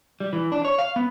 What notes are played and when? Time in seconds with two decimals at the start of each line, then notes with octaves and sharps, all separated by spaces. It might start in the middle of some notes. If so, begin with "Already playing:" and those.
0.20 G3
0.33 E3
0.52 D4
0.65 C#5
0.79 F5
0.96 B3